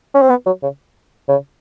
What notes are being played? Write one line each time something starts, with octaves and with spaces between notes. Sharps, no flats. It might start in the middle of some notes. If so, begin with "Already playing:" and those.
C#4
C4
B3
F#3
C#3
C#3